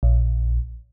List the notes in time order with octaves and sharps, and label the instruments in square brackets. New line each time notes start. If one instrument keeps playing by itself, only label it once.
[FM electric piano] A#1